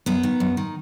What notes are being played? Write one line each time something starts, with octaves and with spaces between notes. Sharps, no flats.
F#2 B3
D#3
F#2
D#3